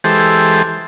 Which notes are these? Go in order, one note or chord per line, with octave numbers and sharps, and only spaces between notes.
E3 G#3 G4 A4 C5